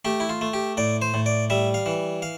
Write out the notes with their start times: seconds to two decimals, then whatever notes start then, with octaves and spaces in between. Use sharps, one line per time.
0.05 A3 G4
0.20 E4
0.29 F4
0.41 A3
0.53 G4
0.77 A2 D5
1.02 C5
1.14 A2
1.26 D5
1.50 G3 E5
1.74 F5
1.86 E3
2.22 F5